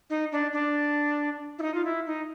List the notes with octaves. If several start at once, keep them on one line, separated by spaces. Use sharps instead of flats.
D#4
D4
D4
E4
D#4
F4
E4
D#4